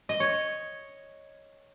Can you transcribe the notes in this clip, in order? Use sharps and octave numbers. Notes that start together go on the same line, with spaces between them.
D#5
C#5